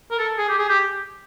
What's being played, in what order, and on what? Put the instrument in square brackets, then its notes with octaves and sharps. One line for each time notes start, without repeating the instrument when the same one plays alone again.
[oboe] A#4
A4
G#4
G4
G#4
G4